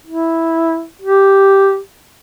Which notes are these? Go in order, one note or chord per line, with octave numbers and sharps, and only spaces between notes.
E4
G4